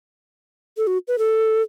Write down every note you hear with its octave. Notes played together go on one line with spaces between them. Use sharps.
A4
F#4
B4
A4